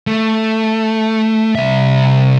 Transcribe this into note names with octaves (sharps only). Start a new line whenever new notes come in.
A3
C2 E5